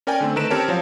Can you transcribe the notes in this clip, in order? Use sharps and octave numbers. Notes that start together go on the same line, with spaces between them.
C#4 A#4 D5 G5 G#5
D3 A3 C4
D#3 A3 B4 A#5 D7 E7
C4 C#4 G4 A#4 C#5 A5
F3 F#3 C#5 F5